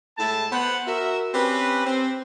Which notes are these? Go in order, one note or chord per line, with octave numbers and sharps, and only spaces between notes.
A2 G#3 E4 A5
B3 C5 F#5
F#4 A#4 E5
C4 C#4 G4 B4
C4